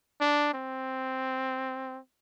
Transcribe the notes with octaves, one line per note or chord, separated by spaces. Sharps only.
D4
C4